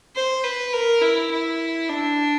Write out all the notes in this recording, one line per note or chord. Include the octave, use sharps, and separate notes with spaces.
C5
B4
A#4
E4
E4
D4